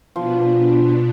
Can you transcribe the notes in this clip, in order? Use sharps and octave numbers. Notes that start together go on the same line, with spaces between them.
B2 F3 B3 D4